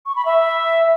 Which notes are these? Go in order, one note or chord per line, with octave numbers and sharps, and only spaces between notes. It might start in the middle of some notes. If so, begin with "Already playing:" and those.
C#6
B5
E5